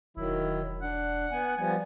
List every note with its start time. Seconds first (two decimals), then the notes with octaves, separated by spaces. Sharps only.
0.17 E1 D#3 F#3 E4
0.82 D4 F#5
1.32 B3 G#5
1.58 F3 G3 B3 G#5